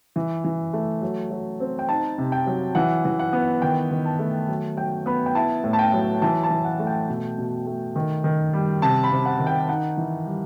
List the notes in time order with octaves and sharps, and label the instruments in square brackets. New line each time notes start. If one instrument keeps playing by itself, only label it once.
[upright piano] E3
E3
A3
F#3
F#3
C4
G5
D#4 A5
C3
G5
F#3
E3 F#5
E3
F#5
B3
D#3 G5
D#3
A5
A3
F#3
F#3 G5
B3 B5
G5
E4 A5
A2
A5
G5
F#3
E3 A5
A5
E3
F#5
A3
G5
B2
B2
A3
D#3
D#3
G3
C3 A5
B5
C3
F#5
D#3
G5
D#4 F#5
E3
G3